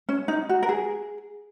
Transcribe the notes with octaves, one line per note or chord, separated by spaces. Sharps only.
C#4
D#4
F#4
A#4
G#4